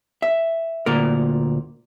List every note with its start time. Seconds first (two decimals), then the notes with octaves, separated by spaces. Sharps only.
0.22 E5
0.86 D2 A#2 A#4